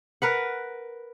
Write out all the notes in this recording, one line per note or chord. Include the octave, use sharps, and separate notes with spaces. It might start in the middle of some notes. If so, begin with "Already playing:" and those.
A#4 B4 F#5